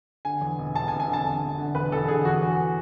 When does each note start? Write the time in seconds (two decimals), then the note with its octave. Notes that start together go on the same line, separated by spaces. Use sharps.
0.25 D3 G#5
0.41 E2
0.59 E1
0.75 E2 A5
0.88 G#5
0.91 E1
1.00 G#5
1.08 D3
1.13 A5
1.26 E1
1.42 E1
1.58 D3
1.75 E1 B4
1.92 E2 A4
2.08 D3 G#4
2.25 E2 F#4
2.42 E2